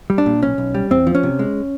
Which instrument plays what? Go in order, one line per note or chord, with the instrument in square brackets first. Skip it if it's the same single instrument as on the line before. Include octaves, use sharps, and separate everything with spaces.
[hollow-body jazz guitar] G3
D4
A#2
B1 C#4
B1
G3
E2 C4
F3
C#4
C3
G#3